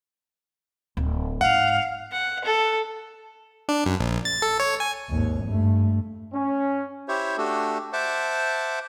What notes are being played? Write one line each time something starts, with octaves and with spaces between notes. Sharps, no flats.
D1
G#2 F5 F#5
F#5
A4
D4
F#2
A#1
A6
A4
C#5
G#5
G#1 D#2
G2 A3
C#4
E4 G4 C5 C#5 E5
A3 D4 F#4 G4 A4
C5 E5 F#5 A5 D6